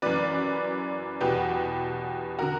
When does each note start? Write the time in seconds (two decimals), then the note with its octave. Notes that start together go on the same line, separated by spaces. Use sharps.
0.02 F#2 E3 B4 D5
1.21 E2 B2 G4 B4
2.39 D3 F#4 A#4